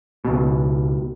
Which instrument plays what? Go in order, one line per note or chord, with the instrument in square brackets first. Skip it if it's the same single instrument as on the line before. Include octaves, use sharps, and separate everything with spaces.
[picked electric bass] C#2 B2